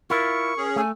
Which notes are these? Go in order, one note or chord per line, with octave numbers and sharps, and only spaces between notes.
E4 F4 A#4 C#6
C#4 G#4
A3 G#5